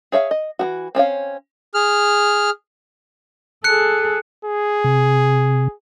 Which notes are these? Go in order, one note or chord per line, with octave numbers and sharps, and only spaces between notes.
G#4 C#5 E5 F5
D#5
E3 A3 F#4
C4 C#4 C#5 F5
G#4 F6
G#4 A4 F#6 C#7
G#4
C3